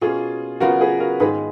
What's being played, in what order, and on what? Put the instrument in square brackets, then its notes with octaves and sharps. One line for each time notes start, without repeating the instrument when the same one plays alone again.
[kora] B2 A#3 C#4 [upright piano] F4 G#4
[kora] C#3 F#3 B3 F4 [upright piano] F#4 A#4
[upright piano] G#4 B4
F#4 A#4
[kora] G#2 D#3 G#3 [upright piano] G#4 B4